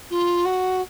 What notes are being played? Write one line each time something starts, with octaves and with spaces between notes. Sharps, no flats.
F4
F#4